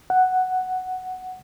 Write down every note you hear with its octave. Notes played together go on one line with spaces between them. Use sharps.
F#5